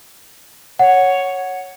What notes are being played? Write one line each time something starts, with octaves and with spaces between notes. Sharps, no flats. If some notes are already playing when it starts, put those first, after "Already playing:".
C#5 F#5